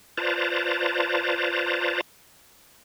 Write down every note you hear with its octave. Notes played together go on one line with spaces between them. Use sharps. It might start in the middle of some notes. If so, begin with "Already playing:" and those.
F4 B4 C5 D5 A5 A#5